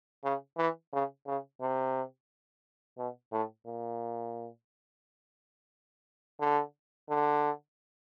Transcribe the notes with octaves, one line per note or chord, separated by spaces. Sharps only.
C#3
E3
C#3
C#3
C3
B2
A2
A#2
D3
D3